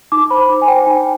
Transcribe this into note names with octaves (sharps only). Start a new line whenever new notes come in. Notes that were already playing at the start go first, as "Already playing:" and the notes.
D#4 D6
C5 B5
D#4
G#5
C5 G5
D#4